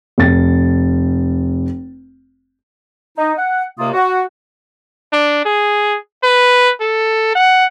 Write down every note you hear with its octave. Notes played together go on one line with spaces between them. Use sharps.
F1 A6
D#4
F#5
D#2 C3 A#3 F4 D#6
F#4
D4
G#4
B4
A4
F#5